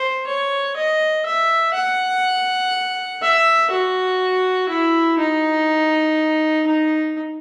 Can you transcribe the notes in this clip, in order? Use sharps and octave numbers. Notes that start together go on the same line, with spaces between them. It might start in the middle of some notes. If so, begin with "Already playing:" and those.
Already playing: C5
C#5
D#5
E5
F#5
E5
F#4
E4
D#4
D#4